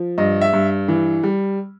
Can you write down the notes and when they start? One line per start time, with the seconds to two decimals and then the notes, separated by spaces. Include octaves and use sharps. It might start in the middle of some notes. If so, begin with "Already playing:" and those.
Already playing: F3
0.18 G2 D#5
0.41 E5
0.53 G2
0.88 E3
1.23 G3